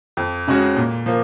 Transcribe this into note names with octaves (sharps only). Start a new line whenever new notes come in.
F2
C#3 G#3 C#4 F#4
A#2
F3 A#3